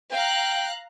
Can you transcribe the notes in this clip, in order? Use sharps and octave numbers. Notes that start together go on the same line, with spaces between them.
F5 G5 A#5 F#6